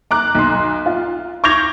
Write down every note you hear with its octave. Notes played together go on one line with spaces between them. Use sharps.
A#5 D6 F#6
B1 C6
F4
C#6 D6 G6 G#6 A#6 F7